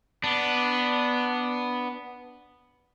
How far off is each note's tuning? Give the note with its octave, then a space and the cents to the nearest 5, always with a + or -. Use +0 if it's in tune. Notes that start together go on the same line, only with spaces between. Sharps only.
B3 +0 D4 +0